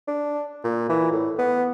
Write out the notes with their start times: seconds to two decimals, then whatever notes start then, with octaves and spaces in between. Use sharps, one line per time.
0.08 D4
0.64 A#2
0.89 E3
1.12 A2
1.38 B3